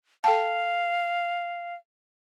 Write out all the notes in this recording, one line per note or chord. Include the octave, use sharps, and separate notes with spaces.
A4 F5 G5 A5